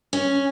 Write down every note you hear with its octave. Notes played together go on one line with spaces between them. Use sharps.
C#4